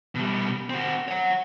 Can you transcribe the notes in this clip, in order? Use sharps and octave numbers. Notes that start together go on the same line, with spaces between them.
B2 G3
C4 F#4
C#5 F#5